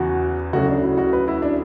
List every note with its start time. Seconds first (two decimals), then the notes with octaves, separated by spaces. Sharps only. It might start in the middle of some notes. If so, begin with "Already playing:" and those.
Already playing: E2 C#3 E3 F#4
0.53 D2 C#3 F#3 F#4
0.68 D4
0.83 E4
0.97 F#4
1.13 B4
1.28 E4
1.42 D4